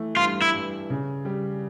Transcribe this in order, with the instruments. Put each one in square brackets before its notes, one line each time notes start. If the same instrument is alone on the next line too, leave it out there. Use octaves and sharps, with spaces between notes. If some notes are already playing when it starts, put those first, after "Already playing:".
Already playing: [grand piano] E3 A3
[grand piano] G2 [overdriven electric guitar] F4
[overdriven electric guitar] E4
[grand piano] G2
C#3
G3